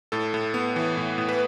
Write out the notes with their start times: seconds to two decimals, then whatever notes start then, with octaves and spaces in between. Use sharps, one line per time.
0.12 A2 A4
0.34 A2
0.54 B3
0.76 E3
0.97 A2
1.18 A2
1.29 B4